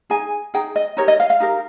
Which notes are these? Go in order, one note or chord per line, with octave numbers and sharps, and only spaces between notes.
D#4 G#4 G#5
D#4 G#4 G5
D#5
D#4 G4 A#4 C#5
D#5
F5
F5
D#4 G4 A#4